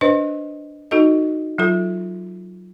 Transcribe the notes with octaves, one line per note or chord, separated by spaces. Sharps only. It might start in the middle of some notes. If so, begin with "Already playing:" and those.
D4 B4 C5 D#5
D#4 F#4 A4 D#5
F#3 F4 A4